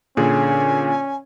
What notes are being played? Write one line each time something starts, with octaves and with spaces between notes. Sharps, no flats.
A#2 D3 C#4 G#4 G#5